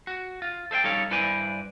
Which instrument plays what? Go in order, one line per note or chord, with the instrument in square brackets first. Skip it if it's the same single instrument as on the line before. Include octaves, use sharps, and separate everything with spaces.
[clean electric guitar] F#4
F4
A4 C5 E5 G5
G3 D#4 A4 C#5 F5
G2 E4 B4 C5 D5 G#5